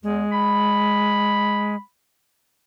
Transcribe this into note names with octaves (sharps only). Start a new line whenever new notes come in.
E2 G#3
B5